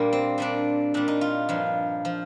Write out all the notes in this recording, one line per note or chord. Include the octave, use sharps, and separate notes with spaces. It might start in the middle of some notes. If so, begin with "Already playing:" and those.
Already playing: A#2 G3 A#3 D4 F4
C4
A#2 G3 D4
A#2 G3 D4
D#4
F4
G2 F3
F3